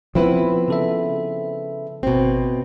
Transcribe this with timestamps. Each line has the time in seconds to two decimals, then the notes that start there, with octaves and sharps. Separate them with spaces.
0.15 F3 B3 C4 E4 B4
0.68 C#3 A4 E5
2.03 G#1 B2 C4